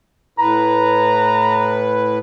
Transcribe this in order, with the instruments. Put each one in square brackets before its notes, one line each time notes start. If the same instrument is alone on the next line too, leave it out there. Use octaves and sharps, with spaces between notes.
[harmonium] A2 B4 [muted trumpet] A#5